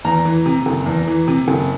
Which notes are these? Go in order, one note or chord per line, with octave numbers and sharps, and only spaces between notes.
E2 A#5
E3
C3
F#1
E2
E3
C3
F#1